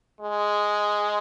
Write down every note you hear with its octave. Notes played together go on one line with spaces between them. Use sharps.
G#3